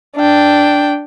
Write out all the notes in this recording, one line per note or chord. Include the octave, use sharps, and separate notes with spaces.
D4 G5